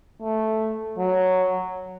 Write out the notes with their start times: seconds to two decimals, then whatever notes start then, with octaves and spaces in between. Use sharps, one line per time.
0.22 A3
0.98 F#3